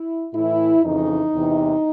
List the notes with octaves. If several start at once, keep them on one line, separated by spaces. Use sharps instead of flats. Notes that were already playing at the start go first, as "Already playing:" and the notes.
Already playing: E4
A2 E3 E4
F2 C#3 E3 D#4
E2 C3 E3